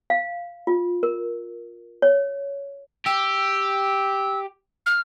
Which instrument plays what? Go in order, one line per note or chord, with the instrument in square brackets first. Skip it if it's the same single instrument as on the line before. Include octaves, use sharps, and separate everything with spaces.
[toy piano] F5
F4
A#4
C#5
[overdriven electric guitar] G4 [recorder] E6
[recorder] F6